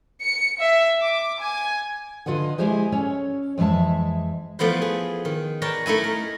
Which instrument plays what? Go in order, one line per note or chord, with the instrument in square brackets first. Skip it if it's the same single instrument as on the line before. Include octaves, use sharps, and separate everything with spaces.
[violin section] C#7
E5
D6
G#5
[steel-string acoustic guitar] D3 F4 B4 D#5 F#5
G#3 E4 G4 G#4 C5 D#5
C#4 A4 C#5
F2 E3 G#3 E5 A5
[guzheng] F3 A3 B3 E4 C5
G#4
D#3
A#4 B4 C#5 D5 G5 A5
A3 D#4 E4 G#5
A#4